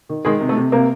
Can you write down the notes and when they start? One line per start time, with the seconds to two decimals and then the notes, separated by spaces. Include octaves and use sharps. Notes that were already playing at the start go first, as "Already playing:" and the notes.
0.09 D#3
0.25 D#3 G#3 G#4
0.40 C3
0.49 A3 A4
0.57 C3
0.72 C3 A#3 A#4